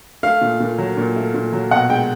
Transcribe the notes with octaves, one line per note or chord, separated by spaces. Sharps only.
A3 F5
A#2
A#2
F#3
A#2
A3
A#2
F#3
B2 F#5
G#3 G5